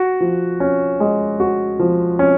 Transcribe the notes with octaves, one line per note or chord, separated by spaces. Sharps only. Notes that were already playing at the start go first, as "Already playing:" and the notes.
Already playing: F#4
F3
C#4
G#3
F#4
F3
C#4